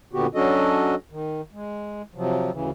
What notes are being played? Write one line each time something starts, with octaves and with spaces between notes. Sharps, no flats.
A#2 D3 B3 F#4 G4
F#3 C#4 D4 F#4 A4 D#5
D#3
G#3
C3 F3 F#3
D2 C#3 E3